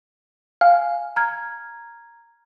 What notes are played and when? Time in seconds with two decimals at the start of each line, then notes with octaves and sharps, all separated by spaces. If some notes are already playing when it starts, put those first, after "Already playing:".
0.61 F5 G#5
1.16 A#5 F6 G#6